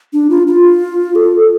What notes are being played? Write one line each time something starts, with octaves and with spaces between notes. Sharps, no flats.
D4
F4
F4
A4